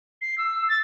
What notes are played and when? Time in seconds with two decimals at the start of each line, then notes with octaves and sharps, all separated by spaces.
0.21 C7
0.38 E6
0.69 A6